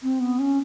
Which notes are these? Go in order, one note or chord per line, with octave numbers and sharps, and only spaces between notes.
C4
B3
C#4